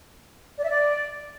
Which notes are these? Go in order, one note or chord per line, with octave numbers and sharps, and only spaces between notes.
D5
E5
D5